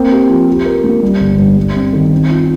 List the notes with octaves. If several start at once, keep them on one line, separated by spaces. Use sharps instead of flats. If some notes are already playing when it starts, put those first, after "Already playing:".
Already playing: A#3 C4
G4
F3
G4
A#4
A#3
G3
G1
G2
G3
C4
D#3
C4
F4